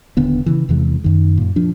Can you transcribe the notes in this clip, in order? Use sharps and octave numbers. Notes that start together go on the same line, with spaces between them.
D#1 D3 B3
C#3 E3
E2 C3 E3 G#3
F#2 D#3
F#2 A#2
F3 D4